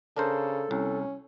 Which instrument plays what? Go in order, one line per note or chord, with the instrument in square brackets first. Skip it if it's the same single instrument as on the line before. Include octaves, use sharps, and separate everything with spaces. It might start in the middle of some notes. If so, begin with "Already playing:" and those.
[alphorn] C#3 [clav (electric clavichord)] D4 A#4 C5 [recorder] A4
[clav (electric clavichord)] C2 [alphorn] C#4